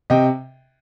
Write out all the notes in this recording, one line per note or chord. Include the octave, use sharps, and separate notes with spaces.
C3 D#5 G5